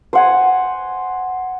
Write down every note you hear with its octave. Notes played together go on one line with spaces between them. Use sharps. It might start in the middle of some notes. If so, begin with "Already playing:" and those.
C5 F#5 G#5